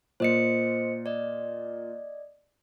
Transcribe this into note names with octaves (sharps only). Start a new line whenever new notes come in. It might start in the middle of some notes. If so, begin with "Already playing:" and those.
A#2 C5 D#5 C#7
D5 D#5